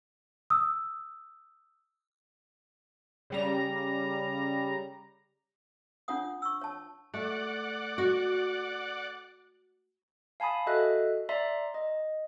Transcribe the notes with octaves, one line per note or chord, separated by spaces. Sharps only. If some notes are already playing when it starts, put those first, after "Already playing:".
D#6 E6
C#3 G3 A#5
D4 F4 C#5 F#5 D#6
C#6 E6
C#5 A5
A3 D5 F#5
F#4
F5 G#5 A5 B5 D#6
F#4 A4 D#5 E5 F#6
D5 E5 A#5 C6
D#5